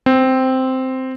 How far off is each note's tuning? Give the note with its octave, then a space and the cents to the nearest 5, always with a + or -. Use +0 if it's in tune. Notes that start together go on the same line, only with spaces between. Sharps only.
C4 -5